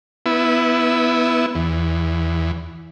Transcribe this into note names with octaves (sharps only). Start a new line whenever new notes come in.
B3 E4
E2